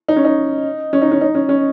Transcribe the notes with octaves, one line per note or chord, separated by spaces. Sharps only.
D#4
C#4
D#4
C#4
D#4
C#4
D#4
C#4
C#4